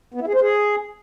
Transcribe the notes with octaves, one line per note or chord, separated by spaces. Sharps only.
B3
E4
G#4
C5
G#4